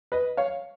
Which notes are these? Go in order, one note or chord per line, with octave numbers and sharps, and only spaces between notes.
B4 D#5
C#5 F5